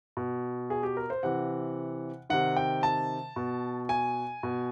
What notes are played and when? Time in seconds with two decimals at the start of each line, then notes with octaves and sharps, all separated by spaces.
0.17 B2
0.70 G#4
0.83 G4
0.97 A#4
1.10 C5
1.23 C3 E3 F#5
2.30 C3 D#3 F#5
2.56 G5
2.83 A5
3.36 B2
3.89 G#5
4.43 B2